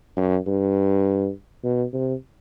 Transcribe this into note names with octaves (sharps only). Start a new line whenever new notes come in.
F#2
G2
B2
C3